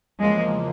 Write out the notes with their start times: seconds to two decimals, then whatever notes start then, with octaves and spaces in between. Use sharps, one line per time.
0.20 E2 C#3 F3 G#3 A#3